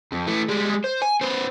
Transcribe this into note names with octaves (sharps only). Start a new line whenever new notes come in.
F2
E3 A3
G3 G#3
C5
G#5
B3 C5